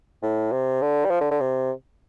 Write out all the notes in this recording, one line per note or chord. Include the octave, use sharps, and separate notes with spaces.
A2
C3
D3
G3
F3
D3
D3
C3